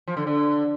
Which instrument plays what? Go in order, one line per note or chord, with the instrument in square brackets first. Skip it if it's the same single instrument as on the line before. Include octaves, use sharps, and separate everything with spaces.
[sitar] F3
D3
D3